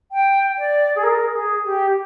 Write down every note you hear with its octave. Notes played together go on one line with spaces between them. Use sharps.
G5
D5
G#4
A#4
G#4
G4